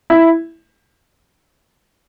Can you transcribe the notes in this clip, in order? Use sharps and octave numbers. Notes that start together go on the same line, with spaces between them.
E4